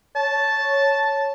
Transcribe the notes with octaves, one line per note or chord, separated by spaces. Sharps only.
C#5 A5